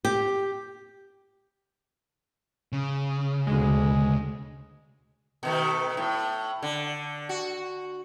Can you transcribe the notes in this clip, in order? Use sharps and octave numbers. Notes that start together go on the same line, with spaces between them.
G4
C#3
D2 B2 D3 G#3
B2 D#3 A3
A2
D3
F#4